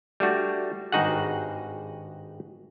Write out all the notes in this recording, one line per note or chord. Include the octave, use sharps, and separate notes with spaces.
G3 A3 D4 F#4
G#1 G2 D#4 F#4 G#4 F#5